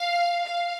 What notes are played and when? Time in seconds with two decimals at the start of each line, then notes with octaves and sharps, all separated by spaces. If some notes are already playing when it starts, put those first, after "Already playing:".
Already playing: F5
0.45 F5